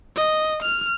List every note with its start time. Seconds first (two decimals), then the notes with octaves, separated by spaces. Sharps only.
0.16 D#5
0.63 F6